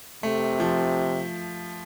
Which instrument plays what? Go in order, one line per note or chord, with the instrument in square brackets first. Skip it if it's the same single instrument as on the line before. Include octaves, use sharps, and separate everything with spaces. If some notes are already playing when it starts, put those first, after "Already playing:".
[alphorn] C3 [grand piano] A3
[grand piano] F3